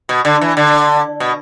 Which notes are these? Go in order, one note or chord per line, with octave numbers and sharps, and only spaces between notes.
B2
D3
E3
D3
B2